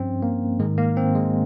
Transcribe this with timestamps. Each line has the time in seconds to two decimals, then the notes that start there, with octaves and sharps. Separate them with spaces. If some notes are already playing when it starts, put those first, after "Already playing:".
Already playing: G2 F3 C4 C#4
0.22 A#3
0.59 G#2 D#3 G#3
0.78 A#3
0.97 C4
1.15 G#3